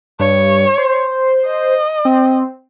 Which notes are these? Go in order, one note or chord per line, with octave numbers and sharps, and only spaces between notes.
G2 C#5
C5
D#5
C4